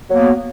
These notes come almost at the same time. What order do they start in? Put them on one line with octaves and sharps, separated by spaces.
F#3 A#3 B3